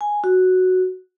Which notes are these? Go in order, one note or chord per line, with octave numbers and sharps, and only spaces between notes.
G#5
F#4